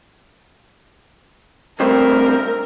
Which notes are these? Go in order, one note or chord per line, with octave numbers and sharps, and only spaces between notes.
G2 A3 C4 A#4